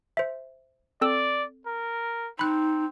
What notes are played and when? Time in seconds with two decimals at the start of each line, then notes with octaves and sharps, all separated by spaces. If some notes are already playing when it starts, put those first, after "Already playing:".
0.17 C5 E5
1.01 C4 A4 D5 E6
1.67 A#4
2.39 C4 D#4 B5 F#6